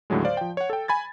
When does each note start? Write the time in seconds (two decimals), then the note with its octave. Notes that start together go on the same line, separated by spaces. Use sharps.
0.10 D#2 A2 D3 F#3 G#3
0.24 C5 D5 F5
0.37 F3 G5
0.57 C#5 F#5
0.70 A4 G5
0.88 G#5 B5 G#6 A6